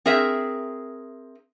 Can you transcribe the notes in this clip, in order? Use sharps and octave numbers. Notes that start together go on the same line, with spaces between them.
C4 G#4 A#4 E5